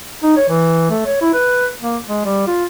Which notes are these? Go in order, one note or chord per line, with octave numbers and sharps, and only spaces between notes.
D#4
C#5
E3
A3
C#5
E4
B4
A#3
G#3
G3
F4